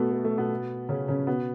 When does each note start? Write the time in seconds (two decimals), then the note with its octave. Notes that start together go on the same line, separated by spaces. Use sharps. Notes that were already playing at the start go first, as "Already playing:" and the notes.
Already playing: B2 A3 B3
0.12 A3
0.24 A3
0.38 B2 B3
0.89 C#3 C#4
1.08 C#3 C#4
1.27 B2 B3